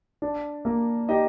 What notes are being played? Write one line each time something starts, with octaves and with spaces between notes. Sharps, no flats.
D4
A#3
D#4 G4 D#5